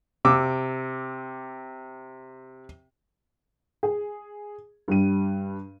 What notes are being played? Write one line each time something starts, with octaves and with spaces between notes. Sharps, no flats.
C3 D6 E6
G#4
G2 G3 D#7